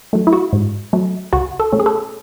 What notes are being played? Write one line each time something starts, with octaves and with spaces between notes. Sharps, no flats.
F#3 A3
E4
F#4
G#2
F#3 A3
C#2 F#4
A4
B2 A3 C#4
G#4
A4